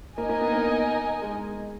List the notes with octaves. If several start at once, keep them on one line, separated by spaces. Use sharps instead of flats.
A#3 D#4 A#4 D#5 G#5
A#3
B3
A#3
G#3